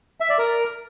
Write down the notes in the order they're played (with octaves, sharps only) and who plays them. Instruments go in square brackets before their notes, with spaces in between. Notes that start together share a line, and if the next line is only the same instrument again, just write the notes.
[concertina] E5
D5
A#4